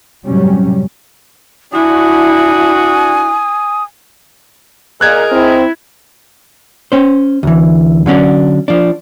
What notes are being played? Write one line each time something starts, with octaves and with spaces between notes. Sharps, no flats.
F#2 A2 C3 F#3 G3 C#4
D4 E4 F#4 G#5 D#6
A#2 G#4 A#4 D#5 F#6 G#6
C4 E4
C#4 C5
D2 E3
D3 F#3 C#4 D4
F3 D4